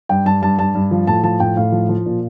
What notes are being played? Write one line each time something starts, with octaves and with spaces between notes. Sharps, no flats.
G2 G5
G2 A5
G2 A5
G2 A5
G2
F3
A2 A5
F3 A5
A2 G5
A2 F5
F3
F3
A#2